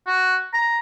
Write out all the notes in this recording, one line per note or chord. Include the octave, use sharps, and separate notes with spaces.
F#4
A#5